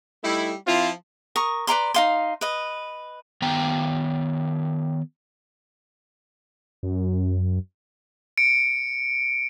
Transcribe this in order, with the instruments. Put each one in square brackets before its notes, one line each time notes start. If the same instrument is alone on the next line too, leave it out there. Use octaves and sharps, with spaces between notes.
[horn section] G3 A3 D#4 E4
F3 C4 E4 F4
[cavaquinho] A#4 C#6 D#6
B4 D5 A#5 C6
D#4 F5 C6
B4 D#5
[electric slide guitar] D#3 B3 G5 A#5
[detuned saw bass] F#2
[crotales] C#7 D7